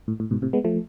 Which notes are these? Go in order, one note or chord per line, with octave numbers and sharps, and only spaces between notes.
A2
A2
G#2 B2
A2 C3
G#3 B3
F3 A3